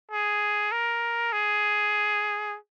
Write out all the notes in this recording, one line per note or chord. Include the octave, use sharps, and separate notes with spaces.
G#4
A#4
G#4